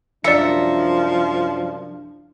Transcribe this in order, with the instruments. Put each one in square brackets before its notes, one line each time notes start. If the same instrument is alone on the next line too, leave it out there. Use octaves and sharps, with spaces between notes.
[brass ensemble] C2 F#2 D4 [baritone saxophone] F3 [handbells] D5 C#7 [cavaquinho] E5 A#5